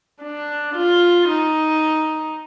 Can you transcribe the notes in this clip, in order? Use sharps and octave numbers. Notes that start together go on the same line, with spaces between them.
D4
F4
D#4